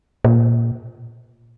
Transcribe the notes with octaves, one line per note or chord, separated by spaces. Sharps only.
A#2